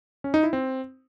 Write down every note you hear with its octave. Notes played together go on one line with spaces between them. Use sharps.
C#4
D#4
E4
C4